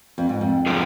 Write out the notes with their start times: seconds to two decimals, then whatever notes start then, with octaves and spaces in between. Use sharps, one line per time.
0.18 F2
0.29 G#2
0.41 F2
0.66 D3 F3 B3 F4 G#4